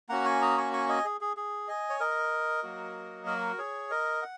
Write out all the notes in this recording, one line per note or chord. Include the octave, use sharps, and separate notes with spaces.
A#3 C#4 F#4 F#5 A#5
G#5 C#6
A#5 D#6
G#5 C#6
G#5 C#6
D#5 G#5
G#4
G#4
G#4
D#5 G#5
C#5
A#4 D#5
F#3 A#3 F#4
F#4 A#4
G#4 C#5
A#4 D#5
F#5